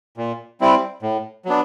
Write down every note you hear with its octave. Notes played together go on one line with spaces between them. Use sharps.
A#2
G3 C4 E4
A2
F#3 B3 D4